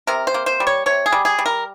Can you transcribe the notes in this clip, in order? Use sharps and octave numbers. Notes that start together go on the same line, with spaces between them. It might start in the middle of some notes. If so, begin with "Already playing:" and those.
C3 A#4
C5
A#3
C5
G3
C#5
C3 C#5
G#4
G3
G#4
G3
A#4